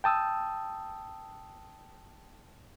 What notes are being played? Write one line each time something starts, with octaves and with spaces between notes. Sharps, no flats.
G5 A5 D#6 E6